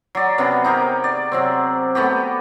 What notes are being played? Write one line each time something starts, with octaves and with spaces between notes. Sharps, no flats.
F#3 D5
C3 B3 C#4 F#4
D#4 G4 G#4 A#4
D5
C3 F#3 C4
A3 B3 F#4 G4